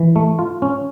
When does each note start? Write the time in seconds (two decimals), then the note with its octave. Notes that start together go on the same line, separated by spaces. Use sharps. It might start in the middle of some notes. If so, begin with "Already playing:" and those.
Already playing: E3
0.16 A3
0.39 F4
0.62 C#4